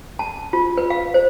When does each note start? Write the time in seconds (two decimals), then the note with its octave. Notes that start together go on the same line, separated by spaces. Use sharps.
0.19 A5
0.53 F4
0.77 B4
0.90 F5
1.14 C5